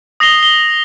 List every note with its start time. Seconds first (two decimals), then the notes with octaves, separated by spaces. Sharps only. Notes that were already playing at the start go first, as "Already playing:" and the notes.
0.20 D#6 A#6 C7 F7 G7
0.43 G7